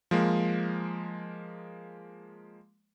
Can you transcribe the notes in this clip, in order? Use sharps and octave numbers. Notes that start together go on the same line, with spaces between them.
F3 G#3 A#3